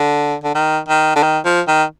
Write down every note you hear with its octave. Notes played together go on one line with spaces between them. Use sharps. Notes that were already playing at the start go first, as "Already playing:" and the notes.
Already playing: D3
D3
D#3
D#3
D3
D#3
F3
D#3